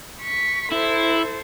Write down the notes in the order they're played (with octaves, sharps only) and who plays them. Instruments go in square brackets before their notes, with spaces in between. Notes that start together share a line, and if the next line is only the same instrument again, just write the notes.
[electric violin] C#6 B6
[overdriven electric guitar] E4 [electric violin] A4 C5